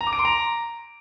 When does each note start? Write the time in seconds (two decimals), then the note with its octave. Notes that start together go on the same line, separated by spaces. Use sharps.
0.01 A#5
0.07 D6
0.13 D7
0.19 C6
0.25 A#5